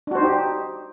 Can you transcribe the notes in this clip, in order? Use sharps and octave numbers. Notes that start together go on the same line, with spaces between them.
D4 D#4 F#4 G4 C5